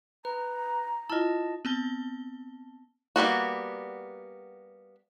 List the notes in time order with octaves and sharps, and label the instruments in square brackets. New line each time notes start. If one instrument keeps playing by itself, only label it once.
[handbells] B4 [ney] A#5
[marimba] E4 F4 [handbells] D#5 A5
[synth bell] B3 C4 A5 G7
[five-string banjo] G3 A#3 B3 F#4